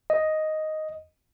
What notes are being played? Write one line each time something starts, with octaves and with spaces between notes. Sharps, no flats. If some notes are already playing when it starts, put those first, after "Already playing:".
D#5